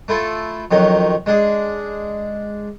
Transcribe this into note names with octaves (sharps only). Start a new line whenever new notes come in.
A3 E4 F4 A4
F2 D#3 F#3 C#4
G#3 D4 G#4